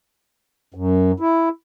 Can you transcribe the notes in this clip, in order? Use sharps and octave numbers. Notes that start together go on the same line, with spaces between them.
F#2
E4